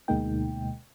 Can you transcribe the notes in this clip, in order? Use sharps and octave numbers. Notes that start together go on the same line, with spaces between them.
D2 B2 G#3 A#3 D#4 G5